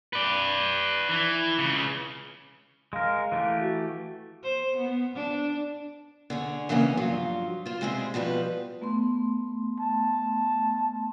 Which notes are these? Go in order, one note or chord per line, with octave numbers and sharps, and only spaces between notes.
B4 D5
E3
C#2 C#3
G#3 A#4 F5
E3 A3 G4
F#4
C5
B3
D4
D3 G#4 C#5
C#3 E3 G3 A#3 B3 C#4
G2 F3 F#3 F4
F4 C5
G3 G#3 C4 E4 G4 G#4
B2 F3 G3 B4
A3 B3 C6
A5